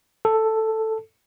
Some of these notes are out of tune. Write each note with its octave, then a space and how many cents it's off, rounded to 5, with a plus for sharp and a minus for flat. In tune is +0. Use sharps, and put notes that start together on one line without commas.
A4 +5